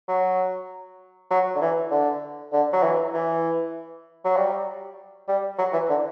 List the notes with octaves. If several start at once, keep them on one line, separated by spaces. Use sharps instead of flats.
F#3
F#3
D3
E3
D3
D3
F#3
E3
E3
F#3
G3
G3
F#3
E3
D3